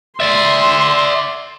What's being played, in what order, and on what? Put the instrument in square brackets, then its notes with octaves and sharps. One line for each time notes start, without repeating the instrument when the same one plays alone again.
[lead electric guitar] D5 E5 [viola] C6